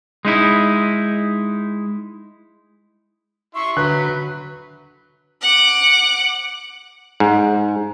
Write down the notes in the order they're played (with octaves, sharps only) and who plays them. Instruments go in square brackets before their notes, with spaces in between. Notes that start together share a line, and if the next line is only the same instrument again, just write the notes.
[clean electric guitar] G#3 D#4 E4
[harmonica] E4 E5 C6 [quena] C#6
[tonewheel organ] D3 [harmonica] F#3 [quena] B4 [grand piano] F#6
[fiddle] F#5 D6
[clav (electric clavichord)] G#2